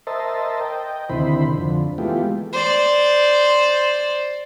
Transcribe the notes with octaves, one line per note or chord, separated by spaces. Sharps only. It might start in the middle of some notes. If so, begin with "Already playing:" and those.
A#4 C5 D#5 E5 A5
D#5 G5
D2 C3 D#3 E4 C5 B5
F2 D3
E3 G#3 A3 B3 F4 G4
C5 D5